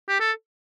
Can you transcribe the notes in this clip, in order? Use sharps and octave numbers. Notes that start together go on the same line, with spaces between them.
G4
A4